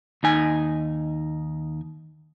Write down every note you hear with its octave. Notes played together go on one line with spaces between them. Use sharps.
D#2 D#4 G#5